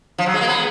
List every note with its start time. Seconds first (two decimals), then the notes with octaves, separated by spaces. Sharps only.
0.18 F3
0.26 F#3
0.34 G#3
0.41 A#3
0.48 B3